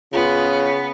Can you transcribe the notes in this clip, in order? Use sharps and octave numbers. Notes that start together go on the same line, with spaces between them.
C#3 B3 F4